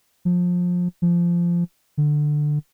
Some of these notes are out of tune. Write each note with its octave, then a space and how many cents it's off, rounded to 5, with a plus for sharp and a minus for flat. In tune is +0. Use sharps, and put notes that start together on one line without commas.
F3 +25
F3 -15
D3 +15